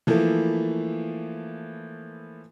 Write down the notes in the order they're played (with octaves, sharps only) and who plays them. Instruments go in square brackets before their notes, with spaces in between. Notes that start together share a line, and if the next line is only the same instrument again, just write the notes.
[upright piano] E3 F3 A3 A#3 E4